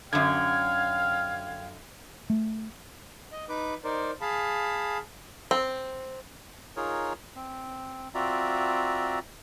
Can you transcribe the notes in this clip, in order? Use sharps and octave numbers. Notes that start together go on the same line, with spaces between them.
F#2 D3 F5 G5 F6 G#6
A3
D#5
D#4 B4 D6
D#4 A#4 C5 D5
G#4 F5 A5 B5
C4
D#4 F4 G#4 A#4 C#5
C4
C4 F4 F#4 D5 E5 A#5